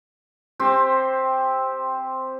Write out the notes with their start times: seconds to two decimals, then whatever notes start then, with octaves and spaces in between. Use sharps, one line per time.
0.60 C4 G4 C5